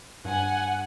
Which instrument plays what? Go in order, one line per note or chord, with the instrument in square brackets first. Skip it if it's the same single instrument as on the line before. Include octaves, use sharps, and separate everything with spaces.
[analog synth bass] G2 [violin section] F#5 G#5